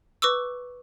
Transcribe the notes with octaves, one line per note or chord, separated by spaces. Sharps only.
B4 C#6 D6 E6